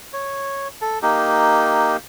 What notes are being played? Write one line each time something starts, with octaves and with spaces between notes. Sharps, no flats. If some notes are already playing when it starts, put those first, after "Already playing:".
C#5
A4
A#3 D#4 G4